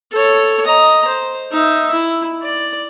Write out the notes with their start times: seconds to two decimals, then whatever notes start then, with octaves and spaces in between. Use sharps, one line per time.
0.12 A4 C#5
0.66 D#5 A#5
1.07 C5
1.51 D#4 E5
1.93 E4
2.43 D5